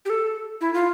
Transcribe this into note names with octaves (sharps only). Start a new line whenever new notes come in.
G4
A4
E4
F4